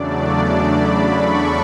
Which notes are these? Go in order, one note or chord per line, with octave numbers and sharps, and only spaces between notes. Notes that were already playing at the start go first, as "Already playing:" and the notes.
Already playing: E2 C#3 F#3 A3 D4 D5
B5
C#6